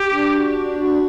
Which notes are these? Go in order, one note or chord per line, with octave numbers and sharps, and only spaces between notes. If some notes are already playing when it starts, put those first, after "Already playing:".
Already playing: G4
D4
F#4
D4
F#4